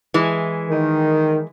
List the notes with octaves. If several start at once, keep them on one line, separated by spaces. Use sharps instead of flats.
E3 G#3
D#3